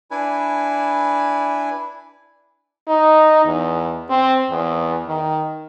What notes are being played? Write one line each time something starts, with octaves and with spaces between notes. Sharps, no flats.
D4 E4 B4 G#5
D#4
E2
C4
E2
D#3